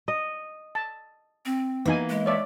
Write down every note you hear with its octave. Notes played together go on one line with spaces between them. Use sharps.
D#5
A5
C4
E3 A#3 B3 D#4 G#5
G#3
C#5 D5 E5